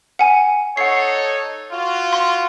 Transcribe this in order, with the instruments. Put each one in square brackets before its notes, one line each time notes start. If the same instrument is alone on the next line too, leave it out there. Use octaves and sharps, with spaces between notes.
[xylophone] F#5 G#5
[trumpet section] D#4 A4 C#5 [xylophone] F#5 C7
[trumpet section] F4 F#4
[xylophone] C6